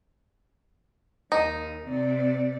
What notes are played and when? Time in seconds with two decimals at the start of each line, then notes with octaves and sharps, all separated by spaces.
1.32 D#2 D#4
1.85 C3 D5